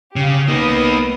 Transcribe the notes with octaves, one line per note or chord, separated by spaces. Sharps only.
C#3 G4 F5
C2 A#3 B3 D#4 D#6